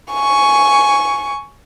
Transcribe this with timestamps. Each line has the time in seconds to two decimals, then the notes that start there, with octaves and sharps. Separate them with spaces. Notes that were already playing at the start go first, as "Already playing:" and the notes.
0.12 G#5 C#6